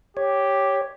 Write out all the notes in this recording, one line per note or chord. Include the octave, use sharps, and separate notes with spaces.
G4 C#5